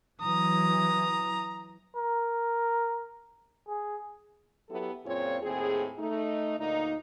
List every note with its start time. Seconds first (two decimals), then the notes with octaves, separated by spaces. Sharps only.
0.21 E3 F#3 A#5 D#6
1.96 A#4
3.68 G#4
4.69 F#3 B3 E4 G4 A4
5.05 F#2 A#2 C4 F4 G#4 C#5
5.42 D#2 A2 C4 G#4
5.99 A3 D#4
6.58 D2 A#2 A#3 D#4